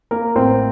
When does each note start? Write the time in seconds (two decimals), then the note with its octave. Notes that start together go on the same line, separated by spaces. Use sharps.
0.11 A#3 A#4
0.35 A1 C4 C5